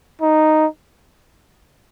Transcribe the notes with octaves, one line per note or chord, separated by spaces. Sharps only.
D#4